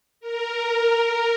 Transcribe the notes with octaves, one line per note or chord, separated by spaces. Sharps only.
A#4